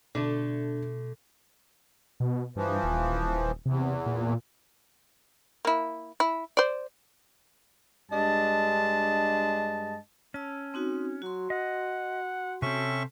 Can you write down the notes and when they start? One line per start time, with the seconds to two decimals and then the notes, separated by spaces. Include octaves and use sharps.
0.15 B2 D3 A3 D4 A4
2.20 B2
2.56 G2 E3 F3
2.84 D#1
3.66 E2 C3
4.06 A#2
5.65 A#3 E4
6.20 E4
6.57 C5 D5
8.11 G2 G#3 D4 D#5 A5
10.34 C#4 A5 E6
10.74 C4 D#4 F#4
11.22 F#3 F#4 C6
11.50 D#5 F#5
12.62 C3 C4 C#4 A4 E5 C#6